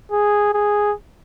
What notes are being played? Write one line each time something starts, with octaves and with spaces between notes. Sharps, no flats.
G#4
G#4